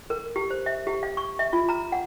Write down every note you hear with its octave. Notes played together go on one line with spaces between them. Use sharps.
A#4
G4
C5
E5
G4
F5
C#6
E5
F4
A#5
F#5